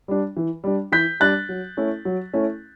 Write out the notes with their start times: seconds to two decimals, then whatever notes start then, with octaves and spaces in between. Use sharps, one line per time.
0.08 G3 D4
0.37 E3
0.64 G3 D4
0.92 E3 G6 B6
1.20 G3 D4 F#6 A6
1.49 F#3
1.77 A3 C#4 E4
2.05 F#3
2.33 A3 C#4 E4